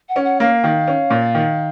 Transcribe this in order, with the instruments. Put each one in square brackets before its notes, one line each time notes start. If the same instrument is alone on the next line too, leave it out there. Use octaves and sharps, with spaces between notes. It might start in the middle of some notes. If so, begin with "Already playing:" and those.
[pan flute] F#5
[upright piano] C#4
[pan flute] F#5
[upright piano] A#3 [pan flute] F5
[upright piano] D#3
C#4
A#2
D#3